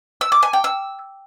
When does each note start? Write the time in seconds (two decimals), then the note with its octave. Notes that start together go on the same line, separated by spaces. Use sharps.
0.21 E6
0.32 D6
0.43 G#5
0.53 G5
0.64 E6